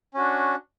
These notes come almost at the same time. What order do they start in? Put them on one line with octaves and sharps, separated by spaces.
C#4 F#4 D4